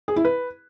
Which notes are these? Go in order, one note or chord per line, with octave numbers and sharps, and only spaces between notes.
G#4
E4
B4